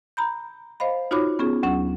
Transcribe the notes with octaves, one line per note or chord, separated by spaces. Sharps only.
A#5 B5 G6
C5 D#5 F5 B5
D#4 F4 F#4 C#5 B5 D6
B3 C#4 F4 G#4
D2 F#3 C#4 F#5